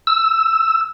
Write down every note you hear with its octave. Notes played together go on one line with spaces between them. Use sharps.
E6